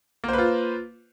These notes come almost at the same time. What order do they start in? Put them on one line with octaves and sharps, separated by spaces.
A#3 C5 B4 F4